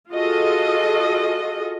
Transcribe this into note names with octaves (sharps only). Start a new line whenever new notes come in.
F4 F#4 G#4 A4 D#5